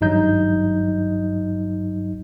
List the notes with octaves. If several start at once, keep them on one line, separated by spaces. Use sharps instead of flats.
G#1 G2 F#3 D#4 D#5 G6